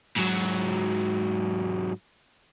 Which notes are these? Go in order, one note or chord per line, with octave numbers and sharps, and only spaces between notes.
G#2 F#3